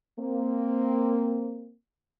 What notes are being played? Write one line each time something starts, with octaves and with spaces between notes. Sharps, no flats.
A#3 C4